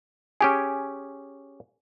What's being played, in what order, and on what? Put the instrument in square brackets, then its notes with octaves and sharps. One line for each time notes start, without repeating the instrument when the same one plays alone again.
[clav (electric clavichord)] C#4 G4 G#4 [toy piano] G#5